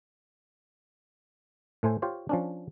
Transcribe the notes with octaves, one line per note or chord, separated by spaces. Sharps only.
A2 A3 C5 G#5
F4 G4 C5 C#5
F3 C#4 D4